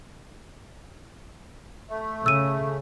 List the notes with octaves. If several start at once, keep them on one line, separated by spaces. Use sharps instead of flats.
A3
C#3 E6 D#7